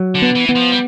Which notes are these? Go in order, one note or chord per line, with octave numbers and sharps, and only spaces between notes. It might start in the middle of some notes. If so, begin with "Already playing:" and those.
Already playing: F#3
D3
B3
E3
B3
F3
G3